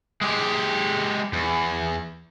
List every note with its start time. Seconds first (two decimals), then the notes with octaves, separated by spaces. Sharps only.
0.22 G#3 G4
1.33 E2